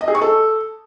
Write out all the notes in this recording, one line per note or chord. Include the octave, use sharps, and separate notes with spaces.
D#5
G#4
C#6
A4